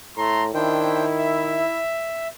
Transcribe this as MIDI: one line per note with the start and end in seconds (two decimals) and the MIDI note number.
0.17 0.50 45
0.17 0.44 57
0.17 0.44 82
0.17 0.44 84
0.54 1.66 51
0.54 1.05 62
0.54 1.80 64
0.54 1.05 72
0.54 1.05 79
1.18 2.28 76